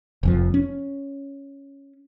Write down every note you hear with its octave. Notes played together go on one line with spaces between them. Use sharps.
F1 F2 F3
C#4